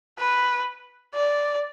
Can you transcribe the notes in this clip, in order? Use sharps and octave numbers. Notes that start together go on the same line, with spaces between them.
B4
D5